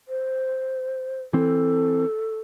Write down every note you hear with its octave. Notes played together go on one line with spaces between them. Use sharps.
C5
E3 C4 A4